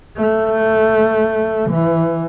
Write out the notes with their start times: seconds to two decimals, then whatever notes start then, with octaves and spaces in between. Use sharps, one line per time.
0.17 A3
1.71 E3